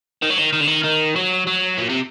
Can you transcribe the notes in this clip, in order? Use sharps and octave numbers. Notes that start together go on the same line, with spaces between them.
D#3
F#3
D#3
D#3
D3
D#3
D#3
F#3
F#3
A#2
C3